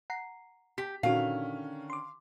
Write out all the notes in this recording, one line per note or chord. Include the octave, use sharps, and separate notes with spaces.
F#5 A#5 C7
G4 B6
A#2 D3 D#3 C#4 F#4 F5
C6 D6